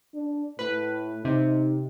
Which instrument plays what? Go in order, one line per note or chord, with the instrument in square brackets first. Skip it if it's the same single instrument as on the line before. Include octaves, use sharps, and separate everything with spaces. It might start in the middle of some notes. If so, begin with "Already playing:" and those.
[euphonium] D4
[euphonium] A2 [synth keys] B4
[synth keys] C3 [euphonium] D#4